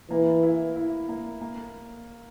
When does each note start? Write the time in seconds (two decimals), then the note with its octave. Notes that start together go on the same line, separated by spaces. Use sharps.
0.10 E3 A#3
0.43 E4
0.76 E4
1.09 A#3
1.41 A#3